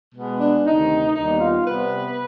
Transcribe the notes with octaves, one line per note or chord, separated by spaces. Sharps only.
B2 G#3 B3
D4
D2 C3 D#3 D#4
D#2 D#3 G3 B3 D#4
F4
C3 G3 B3 B4